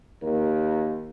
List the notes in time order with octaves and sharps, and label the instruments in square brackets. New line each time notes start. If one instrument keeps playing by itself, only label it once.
[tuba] D#2 [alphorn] A#4